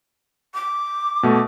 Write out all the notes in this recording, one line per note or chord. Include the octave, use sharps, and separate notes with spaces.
D6
B2 A3